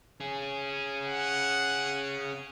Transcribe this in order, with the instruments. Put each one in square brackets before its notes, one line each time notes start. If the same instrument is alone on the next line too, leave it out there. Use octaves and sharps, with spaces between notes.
[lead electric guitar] C#4 G#4
[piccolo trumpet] F#5